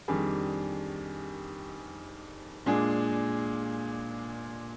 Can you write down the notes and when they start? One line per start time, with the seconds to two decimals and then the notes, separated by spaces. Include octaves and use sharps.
0.08 F2 D#3 G3 D4 G#4
2.66 A#2 G#3 D4 G#4